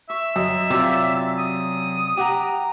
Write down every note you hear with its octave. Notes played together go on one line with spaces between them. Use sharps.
E5 C#6
F#2 D#5
C3 F#3 F4 D5
D#6
G4 F#5 A#5